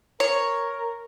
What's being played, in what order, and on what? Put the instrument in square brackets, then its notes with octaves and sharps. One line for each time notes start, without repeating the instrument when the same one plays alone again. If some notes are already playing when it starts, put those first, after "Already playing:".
[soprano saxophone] A#4 [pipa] C#5